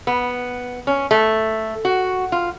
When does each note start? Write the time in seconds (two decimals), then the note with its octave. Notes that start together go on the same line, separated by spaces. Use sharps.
0.07 B3
0.87 C#4
1.11 A3
1.85 F#4
2.32 F4